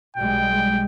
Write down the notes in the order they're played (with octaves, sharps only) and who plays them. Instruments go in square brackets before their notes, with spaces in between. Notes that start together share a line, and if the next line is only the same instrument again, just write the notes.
[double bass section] B1 G3 G#3 [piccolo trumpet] G5